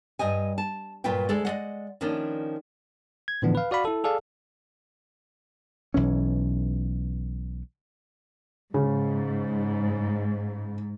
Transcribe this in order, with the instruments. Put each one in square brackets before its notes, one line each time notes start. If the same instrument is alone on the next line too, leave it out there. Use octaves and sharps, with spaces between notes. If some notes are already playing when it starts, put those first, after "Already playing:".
[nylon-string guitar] G2 G4 D#5 G#5
A5
G2 A#2 F#3 F4 B4 G5
D2 G#3 A4 D5
G#3 D5 D#5 F#5
D#3 F3 A#3 C#4 D4
[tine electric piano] G#6
A2 D3 E3 F3 B3 D4
B4 F5
F#4 D5 F5 B5
E4 A4
G#4 A4 D5 F5
[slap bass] B1 E3 C#4
[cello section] G#2 [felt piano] C#3